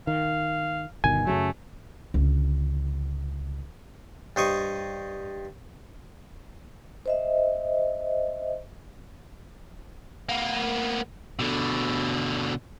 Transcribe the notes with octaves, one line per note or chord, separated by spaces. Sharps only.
D#3 F5
G1 B2 D#3 G#5
F#2 C#3 F#3 A3
C#2 D3
G2 C5 D#5 C#6
C5 D#5 E5
A#3 B3
B2 D3